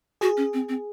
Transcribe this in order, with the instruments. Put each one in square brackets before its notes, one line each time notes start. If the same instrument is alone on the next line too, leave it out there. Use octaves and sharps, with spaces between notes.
[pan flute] F#4 [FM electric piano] G#4
[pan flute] C#4
C4
C4